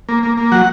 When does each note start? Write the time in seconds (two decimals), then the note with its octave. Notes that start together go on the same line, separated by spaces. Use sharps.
0.09 A#3
0.23 A#3
0.38 A#3
0.52 F#3 F#5